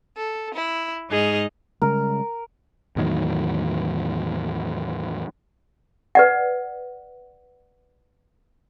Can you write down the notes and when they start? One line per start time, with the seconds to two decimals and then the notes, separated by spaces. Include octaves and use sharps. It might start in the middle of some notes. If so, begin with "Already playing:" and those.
0.17 A4
0.54 E4
1.09 G#2 D#4 G#4 D#5 F6
1.82 C#3 G3 G#3 A#4
2.96 E2 A2 D#3 F#3
6.15 B4 D5 F#5